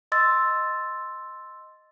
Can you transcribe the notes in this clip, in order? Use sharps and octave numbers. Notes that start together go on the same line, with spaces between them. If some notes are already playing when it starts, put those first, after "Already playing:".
D#5 C6 E6 A6